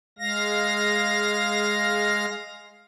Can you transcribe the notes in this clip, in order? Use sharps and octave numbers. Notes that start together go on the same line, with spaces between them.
G#3 F5 A#6